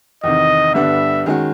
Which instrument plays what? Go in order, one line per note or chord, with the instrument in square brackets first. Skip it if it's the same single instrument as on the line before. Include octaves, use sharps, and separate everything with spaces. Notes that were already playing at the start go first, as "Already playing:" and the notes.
[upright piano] E2 C3 D#3 [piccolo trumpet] D#5
[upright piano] G2 D3 G3 B3 D4 [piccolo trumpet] E5
[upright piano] D#3 G#3 C#4 F#4